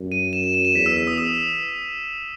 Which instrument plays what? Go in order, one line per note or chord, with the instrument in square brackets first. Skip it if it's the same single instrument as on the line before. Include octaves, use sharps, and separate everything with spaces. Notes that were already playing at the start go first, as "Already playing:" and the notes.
Already playing: [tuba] F#2
[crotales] D#7
E7
D#7
E7
E7
[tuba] E2 [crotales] B6
[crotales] E6
E6
D#6
D#6